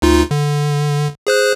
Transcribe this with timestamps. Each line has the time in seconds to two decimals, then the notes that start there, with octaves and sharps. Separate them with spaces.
0.02 D2 D#4 F4
0.31 D3
1.27 G#4 C5 F#6